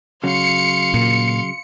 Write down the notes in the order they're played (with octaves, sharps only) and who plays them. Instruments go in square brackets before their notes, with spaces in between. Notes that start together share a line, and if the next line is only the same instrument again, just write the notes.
[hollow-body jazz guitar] C#3 F#3 [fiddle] F5 C6 [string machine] C#7
[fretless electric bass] A#2